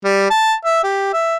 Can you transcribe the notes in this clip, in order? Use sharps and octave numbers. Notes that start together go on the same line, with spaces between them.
G3
A5
E5
G4
E5